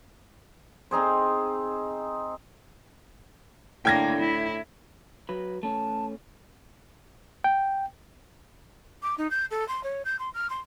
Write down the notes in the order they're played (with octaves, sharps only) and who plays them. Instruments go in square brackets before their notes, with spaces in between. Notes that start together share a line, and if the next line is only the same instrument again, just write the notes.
[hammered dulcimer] C4 D#4 G#4 C5
[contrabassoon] A2 [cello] D3 A#3 [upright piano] G5 G#6 A#6
[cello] E4
[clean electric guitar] F#3 B4
[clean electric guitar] A3 C#4 [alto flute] A5
[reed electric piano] G5
[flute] D6
D#4
G6
A4
C6
C#5
G6
C6
F6
C6